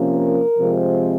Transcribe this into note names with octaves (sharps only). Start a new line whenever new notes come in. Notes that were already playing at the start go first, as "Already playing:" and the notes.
Already playing: C3 F3 A#3 C#4
A#4
C3 F3 G#3 C4